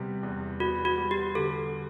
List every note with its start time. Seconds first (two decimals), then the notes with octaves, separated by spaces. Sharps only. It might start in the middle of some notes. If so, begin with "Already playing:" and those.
Already playing: C3 G3 B3
0.23 E2
0.60 B3 F#4
0.85 F#4
0.97 G3
1.11 G4
1.35 D3 A4